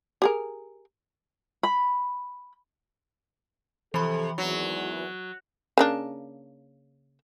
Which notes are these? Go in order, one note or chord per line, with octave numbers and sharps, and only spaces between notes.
G4 G#4 A#4
B5
C3 E3 F3 A4 B5
G#1 E2 F#3
C#3 A#3 D4